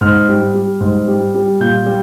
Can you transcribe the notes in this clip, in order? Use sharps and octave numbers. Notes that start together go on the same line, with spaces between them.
G#2 F6
G3
G3
G#2
G3
G3
A#2 G6
G3